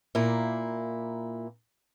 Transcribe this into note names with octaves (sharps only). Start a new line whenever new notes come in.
A#2 A#3 E4